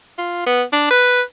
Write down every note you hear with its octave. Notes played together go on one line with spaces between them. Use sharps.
F4
B3
D4
B4